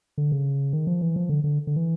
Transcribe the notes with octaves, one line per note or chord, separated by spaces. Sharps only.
D3
C#3
D#3
F3
E3
F3
D3
D3
D3
E3